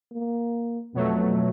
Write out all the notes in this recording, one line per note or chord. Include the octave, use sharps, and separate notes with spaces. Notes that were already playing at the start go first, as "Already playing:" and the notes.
A#3
F2 B2 F#3 A3